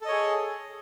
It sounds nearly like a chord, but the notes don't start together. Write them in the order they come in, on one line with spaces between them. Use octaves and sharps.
A4 D#5 C#5 G#4